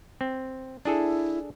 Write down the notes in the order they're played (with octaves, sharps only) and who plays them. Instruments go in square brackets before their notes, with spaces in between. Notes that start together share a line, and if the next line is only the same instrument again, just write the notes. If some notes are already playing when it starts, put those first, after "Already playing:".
[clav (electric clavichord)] C4
[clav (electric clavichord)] D4 G#4 A4 [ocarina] E4